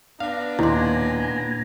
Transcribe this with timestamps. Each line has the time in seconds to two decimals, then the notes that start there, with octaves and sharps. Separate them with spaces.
0.20 B3 D4 F5 A#5
0.59 D#2 A#2 E4 G#5 A#5 C6